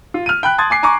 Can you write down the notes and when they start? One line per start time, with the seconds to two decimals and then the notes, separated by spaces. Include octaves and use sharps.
0.14 F4
0.26 F6 D#7
0.43 G5 B5 F#6
0.58 A5 C6 D#6 G#6 A6
0.70 G#5 D6 C7
0.83 G#5 A#5 C#6 D6